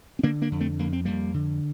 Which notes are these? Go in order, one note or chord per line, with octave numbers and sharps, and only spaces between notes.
C4
D3 A#3 D4
A#3 D4
F2
A3 C4
F2 A#3
C4
F2 G3 A#3
D3